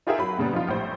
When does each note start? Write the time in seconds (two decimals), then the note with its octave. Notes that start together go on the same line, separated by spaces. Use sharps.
0.07 D#4 F4 G4 G#4 A#4 E5
0.19 F#3 B5
0.38 A#2 C#3 G3 B3
0.53 F3 D#4 F4
0.68 A#1 A2 G3 C5